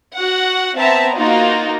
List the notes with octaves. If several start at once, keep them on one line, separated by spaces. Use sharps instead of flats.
F#4 F#5
B3 C4 E5 A5 A#5
A#3 D#4 F4 F#4